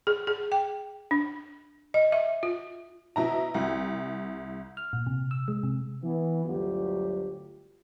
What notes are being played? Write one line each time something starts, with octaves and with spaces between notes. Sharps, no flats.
G#4
G#4
G5
D4
D#5
E5
F4
B2 E4 A#5
C2
F6
A#2
C3
E6
G#3
C3
E3 B3
G1 D2 F#3 F4 G4